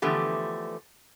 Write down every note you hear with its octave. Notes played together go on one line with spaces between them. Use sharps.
D3 E3 F3 A3 B3 G4